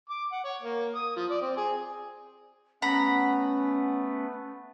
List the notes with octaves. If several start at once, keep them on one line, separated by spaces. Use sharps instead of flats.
D6
F#5
C#5
A#3
D#6
F3
D5
C4
G#4
A3 B3 C#4 B4 F#5 A#5 B5